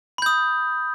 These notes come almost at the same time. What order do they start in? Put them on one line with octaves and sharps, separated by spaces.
B5 G6 D#6